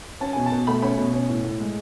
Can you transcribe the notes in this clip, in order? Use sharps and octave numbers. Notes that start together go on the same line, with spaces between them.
C#4 A5
B2 G#5
A5
B2
A3 B5
C#4 B5
B2
C#4
A2
A2
G#3